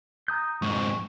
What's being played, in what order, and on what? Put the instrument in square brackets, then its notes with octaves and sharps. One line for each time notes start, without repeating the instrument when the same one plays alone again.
[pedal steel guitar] A#5 D#6 G6
[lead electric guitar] F2 G#2 [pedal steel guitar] C#6